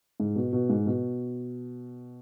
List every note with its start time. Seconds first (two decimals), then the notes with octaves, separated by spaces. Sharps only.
0.20 G#2
0.36 B2
0.53 B2
0.70 G#2
0.86 B2